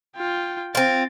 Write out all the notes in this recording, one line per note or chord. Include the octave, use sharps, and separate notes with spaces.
F4 G5
C4 F4 A6 D7